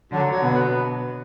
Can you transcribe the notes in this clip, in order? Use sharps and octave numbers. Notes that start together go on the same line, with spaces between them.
D3 F#3
F#3
B2
B3